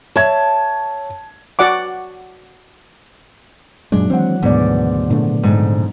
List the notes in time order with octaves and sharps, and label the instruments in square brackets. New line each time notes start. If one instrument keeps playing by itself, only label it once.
[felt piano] C#5 E5 G#6 [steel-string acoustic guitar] A5
[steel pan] F#4 D5 F#5 D6
[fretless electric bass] F#2 A#2 G#3 [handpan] F#3 [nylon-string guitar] D4
[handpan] D#3 E3 F#5 [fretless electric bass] G#3 A#3 C4
[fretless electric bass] D2 [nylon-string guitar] G#2 [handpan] B2 B3 D5
[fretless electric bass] A#2 D3 A3 [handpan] D4
[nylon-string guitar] F2 G#2